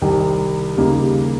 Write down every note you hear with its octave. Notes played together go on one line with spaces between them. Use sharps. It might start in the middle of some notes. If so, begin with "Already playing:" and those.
C2 C3 D#3
D#2 C#3 G3 A#3 D#4